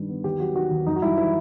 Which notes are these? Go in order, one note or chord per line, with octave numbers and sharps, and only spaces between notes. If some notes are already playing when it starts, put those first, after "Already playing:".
Already playing: G2 D#3 G3
B3
D#2 G4
F#3 F#4
D#3 F#4
D#2
F#2 D#4
F#4
G3 E4
E3 E4